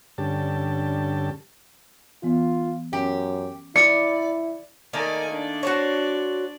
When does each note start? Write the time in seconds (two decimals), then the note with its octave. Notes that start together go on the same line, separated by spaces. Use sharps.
0.18 G2 D3 C#4 G4 A5
2.23 E3 B3 F4
2.93 F#2 C#4 G4
3.76 E4 D5 C#7
4.93 D#3 A3 A#3 A#4 D5 G#5
5.31 D4 D5
5.63 F#4 C5 C#5